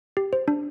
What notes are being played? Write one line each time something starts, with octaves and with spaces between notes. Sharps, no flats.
G4
C5
D4